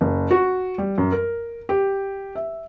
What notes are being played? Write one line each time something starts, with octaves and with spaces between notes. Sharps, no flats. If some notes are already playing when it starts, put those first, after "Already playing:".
F#1
F#4
G3
F#2
A#4
G4
E5